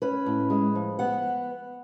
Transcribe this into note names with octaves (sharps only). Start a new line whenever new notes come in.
C#4 B4
A2
G#3
F3
B3 F#5